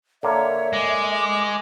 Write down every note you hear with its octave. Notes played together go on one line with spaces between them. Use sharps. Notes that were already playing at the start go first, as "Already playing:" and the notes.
D3 A#3 C#5 E5
G#3 D6